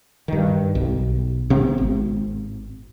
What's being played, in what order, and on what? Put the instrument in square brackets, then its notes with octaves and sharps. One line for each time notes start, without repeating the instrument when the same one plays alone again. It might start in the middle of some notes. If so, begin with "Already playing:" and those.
[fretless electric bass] G2 D#3
B1
C3 B3 C4
G#1